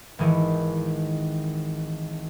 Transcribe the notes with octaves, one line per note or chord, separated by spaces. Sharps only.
G#1 D#3 E3